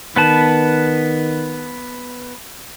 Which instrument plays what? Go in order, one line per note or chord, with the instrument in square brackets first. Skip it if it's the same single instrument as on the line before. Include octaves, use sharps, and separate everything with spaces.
[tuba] D#3 [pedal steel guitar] B3 B4 A5